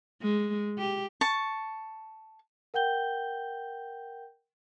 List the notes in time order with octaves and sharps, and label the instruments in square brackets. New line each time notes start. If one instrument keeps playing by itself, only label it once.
[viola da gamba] G#3
G4
[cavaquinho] A5 C#6
[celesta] A#4 F#5 G5 G6 G7